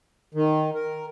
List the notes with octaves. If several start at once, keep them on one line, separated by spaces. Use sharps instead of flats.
D#3
A#4